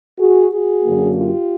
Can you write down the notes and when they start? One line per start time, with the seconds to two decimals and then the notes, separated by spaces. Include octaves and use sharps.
0.18 F#4 G#4
0.51 F#4 G#4
0.85 F#2 D3 F#3 A#3
1.17 F4 G4